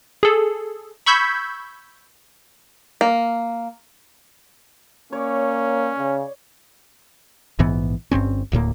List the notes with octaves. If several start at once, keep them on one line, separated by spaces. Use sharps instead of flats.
G#4 A4
B5 C#6 E6 G6 G#6 B6
A#3
A#3 C#4 C#5 D5
C#3
A#1 G#2 E3 B3
G1 G2 C4 C#4
D1 D2 A2 A#3